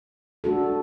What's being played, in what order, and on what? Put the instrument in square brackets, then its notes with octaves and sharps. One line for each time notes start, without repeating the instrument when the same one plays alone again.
[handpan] A3 D4 F#4 A4